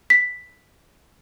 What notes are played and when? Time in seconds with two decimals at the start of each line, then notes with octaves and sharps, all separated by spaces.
0.10 B6